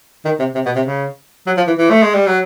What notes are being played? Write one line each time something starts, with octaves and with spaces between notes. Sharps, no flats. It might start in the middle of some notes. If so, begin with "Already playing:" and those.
D#3
C3
C3
B2
C3
C#3
F#3
F3
E3
E3
A3
G#3
G3
F#3